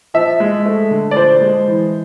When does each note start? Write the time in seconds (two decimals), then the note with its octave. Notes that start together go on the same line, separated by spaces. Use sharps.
0.14 F3 E5
0.40 G#3
0.65 A3
0.91 D3
1.11 D5
1.16 F3 C5
1.41 G#3
1.68 E3